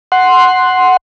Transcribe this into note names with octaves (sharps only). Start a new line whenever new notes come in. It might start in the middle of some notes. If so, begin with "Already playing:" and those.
F#5 C6